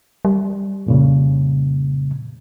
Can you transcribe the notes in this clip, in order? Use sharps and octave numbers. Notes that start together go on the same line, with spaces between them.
G3
F2 A#2 C#3